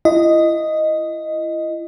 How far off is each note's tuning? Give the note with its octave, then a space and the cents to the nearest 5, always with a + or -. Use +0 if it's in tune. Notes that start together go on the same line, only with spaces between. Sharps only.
E4 +35 D#5 +0